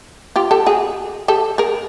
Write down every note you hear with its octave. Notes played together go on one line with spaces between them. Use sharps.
F4 G4
G4 A4
F#4 G#4
G4 A4
G#4 A#4